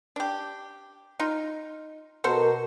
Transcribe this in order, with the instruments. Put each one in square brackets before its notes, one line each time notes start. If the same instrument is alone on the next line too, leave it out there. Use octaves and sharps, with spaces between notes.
[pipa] D4 G4
D#4 F4
[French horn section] B2 A#4 [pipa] F#4 A4 C5